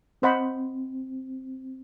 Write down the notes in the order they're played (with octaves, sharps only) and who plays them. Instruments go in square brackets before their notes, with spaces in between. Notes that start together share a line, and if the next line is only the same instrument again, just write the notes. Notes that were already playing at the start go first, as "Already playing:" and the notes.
[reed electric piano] C4 [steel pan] C5 D#5 F#5 B5